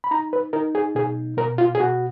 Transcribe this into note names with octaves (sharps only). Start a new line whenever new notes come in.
B5
D#4 A#5
B4
D#4 A#4
G#4
B2 G#4
B2 A#4
F4
G#4
B2 F#4